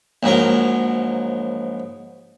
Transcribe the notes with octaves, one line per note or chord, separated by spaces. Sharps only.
A#1 G#2 F#3 A#4